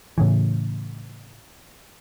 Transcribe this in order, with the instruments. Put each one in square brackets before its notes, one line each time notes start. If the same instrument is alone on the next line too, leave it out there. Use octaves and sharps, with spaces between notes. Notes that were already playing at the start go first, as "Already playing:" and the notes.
[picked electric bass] A2 C#3 E3